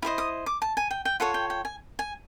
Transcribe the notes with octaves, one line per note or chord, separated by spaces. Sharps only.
E4 G4 C5 D#5
D#6
D6
A5
G#5
G5
G5
F4 A4 C#5 F#5
G5
G5
G#5
G#5